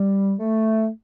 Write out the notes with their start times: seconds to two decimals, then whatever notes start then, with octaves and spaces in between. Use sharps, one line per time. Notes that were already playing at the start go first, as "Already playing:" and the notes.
Already playing: G3
0.39 A3